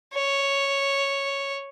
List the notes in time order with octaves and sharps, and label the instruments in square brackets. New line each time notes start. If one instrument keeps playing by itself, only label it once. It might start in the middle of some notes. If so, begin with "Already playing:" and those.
[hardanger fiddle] C#5